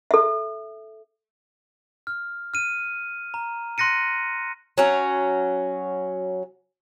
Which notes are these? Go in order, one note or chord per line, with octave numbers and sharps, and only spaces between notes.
A4 E5
F6
F6 D#7
A#5
C6 F#6 A#6 C#7 D#7
F#3 C#4